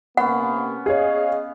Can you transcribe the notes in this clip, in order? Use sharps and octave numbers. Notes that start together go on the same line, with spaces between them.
C3 A#3 B3 C#4 F#5
G#4 C#5 D#5 F5